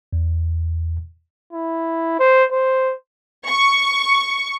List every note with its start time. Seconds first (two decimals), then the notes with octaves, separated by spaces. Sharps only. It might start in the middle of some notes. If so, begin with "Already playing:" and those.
0.13 E2
1.53 E4
2.19 C5
2.52 C5
3.47 C#6